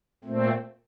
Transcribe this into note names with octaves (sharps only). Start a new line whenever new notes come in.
A#2 A3 C4